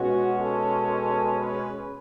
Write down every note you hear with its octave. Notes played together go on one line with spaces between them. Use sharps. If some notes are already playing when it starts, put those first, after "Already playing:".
Already playing: B2 G#3 C#4 F#4
A4
A4
B4